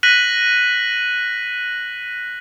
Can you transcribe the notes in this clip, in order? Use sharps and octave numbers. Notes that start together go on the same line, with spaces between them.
F#6 A#6 B6 D#7 F#7